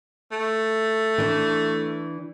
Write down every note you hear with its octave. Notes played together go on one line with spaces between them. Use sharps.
A3
E3 D4